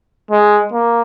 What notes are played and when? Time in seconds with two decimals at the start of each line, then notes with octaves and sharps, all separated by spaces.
0.31 G#3
0.73 A#3